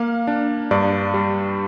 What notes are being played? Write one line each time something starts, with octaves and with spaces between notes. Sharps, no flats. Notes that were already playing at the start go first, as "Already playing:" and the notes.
Already playing: A#3 F5
D4
G2 D5
G3